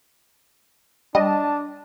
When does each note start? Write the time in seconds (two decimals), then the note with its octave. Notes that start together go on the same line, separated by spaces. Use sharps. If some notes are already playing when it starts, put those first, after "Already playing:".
1.15 G3 D4 D#5 A5